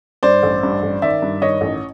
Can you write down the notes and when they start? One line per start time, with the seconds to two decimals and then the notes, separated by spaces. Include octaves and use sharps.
0.23 G2 C5 D5
0.43 A1
0.63 G2
0.83 A1
1.02 D#3 D5 E5
1.22 G2
1.41 D#3 C#5 D#5
1.61 A1